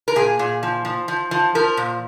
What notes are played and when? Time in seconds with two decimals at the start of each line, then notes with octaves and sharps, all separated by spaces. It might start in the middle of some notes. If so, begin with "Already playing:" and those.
0.08 A#4
0.16 A#2 G#4
0.39 A#2
0.63 F3
0.85 F3
1.08 F3
1.31 F3
1.55 F3 A#4
1.77 A#2